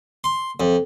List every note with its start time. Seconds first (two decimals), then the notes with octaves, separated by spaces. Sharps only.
0.24 C6
0.60 F2